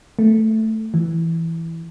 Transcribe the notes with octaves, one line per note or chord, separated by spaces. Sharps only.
A3
E3